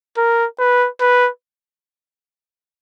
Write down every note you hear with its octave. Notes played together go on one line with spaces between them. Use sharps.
A#4
B4
B4